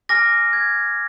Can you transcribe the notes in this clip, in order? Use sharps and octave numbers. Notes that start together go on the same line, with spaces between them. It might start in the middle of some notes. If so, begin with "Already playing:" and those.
G#5 D6 F6 A#6
G#6